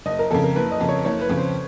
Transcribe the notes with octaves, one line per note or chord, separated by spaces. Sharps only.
F#1 D#5
A#4
F2 C#3 A4
A#4
F#1 B4
D#5
F2 C#3
C#5
F#1 C#5
B4
F2 C#3
C5